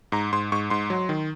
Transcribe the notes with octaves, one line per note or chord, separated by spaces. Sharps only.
G#2 A#5
G#2 C6
G#2 C#6
G#2 C6
F#3
D#3